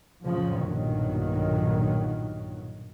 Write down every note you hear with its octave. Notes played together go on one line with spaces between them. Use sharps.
F2 A2 C#3 F3
B1 G2 A#2 D#3 F#3